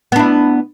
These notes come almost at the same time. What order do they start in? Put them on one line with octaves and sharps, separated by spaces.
B3 D4 E4